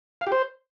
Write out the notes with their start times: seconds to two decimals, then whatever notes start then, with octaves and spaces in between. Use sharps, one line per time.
0.21 F5
0.27 G4
0.32 C5